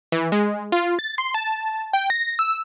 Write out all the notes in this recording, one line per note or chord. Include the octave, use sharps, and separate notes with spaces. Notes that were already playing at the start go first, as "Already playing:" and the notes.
E3
G#3
F4
A6
C6
A5
G5
A#6
E6